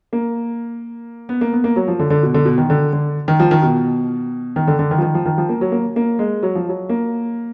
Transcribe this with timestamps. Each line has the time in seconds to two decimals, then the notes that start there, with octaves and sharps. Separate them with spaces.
0.13 A#3
1.29 B3
1.41 A#3
1.53 B3
1.64 A#3
1.76 F#3
1.88 F3
1.99 D3
2.10 D3
2.23 B2
2.34 D3
2.45 B2
2.58 D#3
2.70 D3
2.93 D3
3.28 D#3
3.40 F3
3.51 D#3
3.62 B2
4.56 D#3
4.67 D3
4.79 D3
4.91 D#3
4.98 F3
5.02 D#3
5.15 F3
5.26 D#3
5.38 F3
5.49 A#3
5.61 F#3
5.72 A#3
5.96 A#3
6.19 G#3
6.43 F#3
6.55 F3
6.69 F#3
6.89 A#3